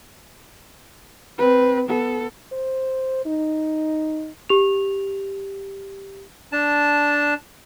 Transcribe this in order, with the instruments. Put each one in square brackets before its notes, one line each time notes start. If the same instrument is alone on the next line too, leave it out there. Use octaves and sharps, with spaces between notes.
[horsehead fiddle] C4 B4
B3 A4
[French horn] C5
D#4
[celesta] G4 F7
[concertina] D4 A5